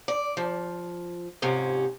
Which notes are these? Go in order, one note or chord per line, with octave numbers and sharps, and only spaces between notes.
D5
F3
F2 G#2 C3 C#4